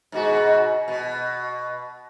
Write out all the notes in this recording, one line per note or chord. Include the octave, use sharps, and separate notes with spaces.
G#2 B2 F#4
B2